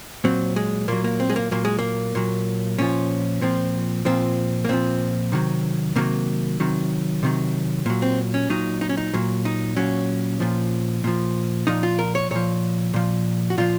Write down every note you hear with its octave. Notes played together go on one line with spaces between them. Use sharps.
A#2 F#3 C4
G#3
A#2 F#3 A#3
A#3
C4
G#3
A#3
A#2 F#3 A#3
G#3
A#3
A#2 F#3
A#2 F3 C#4
A#2 F3 C4
A#2 F3 C4
A#3
A#2 F3 C4
C3 D#3 F#3
C3 D#3 F#3 A#3
C3 D#3 F#3
C3 D#3 F#3
A#2 F#3
C4
C#4
A#2 F#3 D#4
D#4
C#4
D#4
A#2 F#3
D#4
A#2 F#3 C#4
A#2 F3
A#2 F3
A#2 F3 D#4
F4
A#4
C#5
A#2 F3 C#5
A#2 F3
F#4
A#2 F3 F4